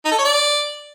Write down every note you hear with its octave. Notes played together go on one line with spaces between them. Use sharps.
D#4
A4
C#5
D5